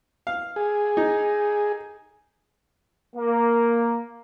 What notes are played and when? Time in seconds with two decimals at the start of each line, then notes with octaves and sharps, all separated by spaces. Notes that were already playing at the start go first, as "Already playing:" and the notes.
0.27 F5
0.56 G#4
0.97 D#4
3.16 A#3